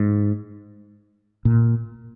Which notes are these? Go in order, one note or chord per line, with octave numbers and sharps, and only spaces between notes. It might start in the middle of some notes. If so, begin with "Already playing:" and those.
Already playing: G#2
A#2